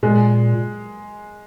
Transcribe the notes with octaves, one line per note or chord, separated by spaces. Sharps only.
A#2 G#3